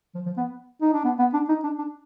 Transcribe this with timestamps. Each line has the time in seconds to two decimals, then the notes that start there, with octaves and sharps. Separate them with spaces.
0.15 F3
0.26 F3
0.37 B3
0.82 D#4
0.93 D4
1.04 B3
1.19 B3
1.34 D4
1.49 D#4
1.64 D4
1.78 D4